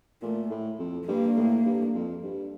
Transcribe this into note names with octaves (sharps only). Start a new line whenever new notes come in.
A#2 A3
A2
F2
G2 A#3
A2
G2
F2
G2